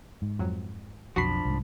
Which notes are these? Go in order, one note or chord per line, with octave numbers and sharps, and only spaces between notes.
G#2
F2 F#3
B1 F2 F3 D4 F#4 B5 C7
C2 G#2